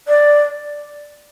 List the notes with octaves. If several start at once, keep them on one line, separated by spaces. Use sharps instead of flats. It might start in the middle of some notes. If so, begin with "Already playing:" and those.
D5